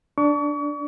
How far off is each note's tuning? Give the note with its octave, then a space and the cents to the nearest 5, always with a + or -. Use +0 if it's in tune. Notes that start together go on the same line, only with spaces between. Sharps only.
D4 -5 C#6 +40